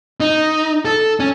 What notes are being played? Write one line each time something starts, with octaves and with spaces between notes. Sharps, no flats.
D#4
A4
C#4